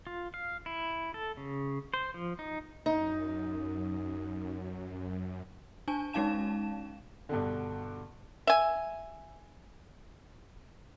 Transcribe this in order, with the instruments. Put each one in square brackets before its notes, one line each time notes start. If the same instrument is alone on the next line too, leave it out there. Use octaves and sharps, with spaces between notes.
[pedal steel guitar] F4
F5
E4
A4
C#3
C5
F3
D#4
[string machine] F#2 [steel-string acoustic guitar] D#4
[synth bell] D4 G#5 A5
G#3 C#4 D#4 F5 A5 E7
[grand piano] G2 B2 D3
[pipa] E5 G#5